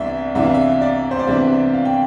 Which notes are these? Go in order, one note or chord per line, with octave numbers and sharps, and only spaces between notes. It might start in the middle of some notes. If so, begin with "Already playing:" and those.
Already playing: C2 C3 E3 B3 D4 D5 E5
C2 C3 E3 B3 D4 E5
F5
E5
D5
C5
D5
C2 C3 E3 B3 D4 E5
F5
G5